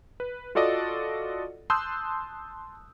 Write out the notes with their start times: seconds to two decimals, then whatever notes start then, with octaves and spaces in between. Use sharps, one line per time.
0.20 B4
0.55 F4 F#4 A4 D5 D#5 F#5
1.70 A5 C6 D#6 E6 F#6 G6